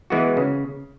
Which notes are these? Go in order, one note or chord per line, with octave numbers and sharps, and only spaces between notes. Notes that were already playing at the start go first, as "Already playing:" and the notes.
E3 G#3 B3 F#4
C#3